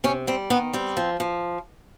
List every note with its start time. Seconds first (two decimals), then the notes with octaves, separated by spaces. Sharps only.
0.04 C3 C#4
0.27 G3 C4
0.50 D#3 B3
0.73 G3 C4
0.97 F3
1.20 F3